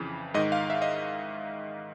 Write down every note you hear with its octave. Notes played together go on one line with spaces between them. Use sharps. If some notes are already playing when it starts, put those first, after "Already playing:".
Already playing: F2 C#3 E3
G#2 D#3 D#5
F5
E5
D#5